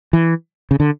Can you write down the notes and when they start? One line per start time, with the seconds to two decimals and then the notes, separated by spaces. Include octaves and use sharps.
0.13 E3
0.71 C#3
0.80 D3